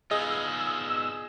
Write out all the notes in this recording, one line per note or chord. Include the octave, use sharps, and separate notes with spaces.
B3 D#4 F4 G#4 D#5 E6